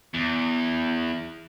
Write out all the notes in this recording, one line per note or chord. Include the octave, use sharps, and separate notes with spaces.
E2